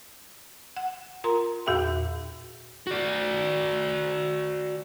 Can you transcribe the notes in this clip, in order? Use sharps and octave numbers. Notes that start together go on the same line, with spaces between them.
F#5
F4 A#4 A#5 C6
E2 A#2 F#4 G#4 E5 G5
F#4 D5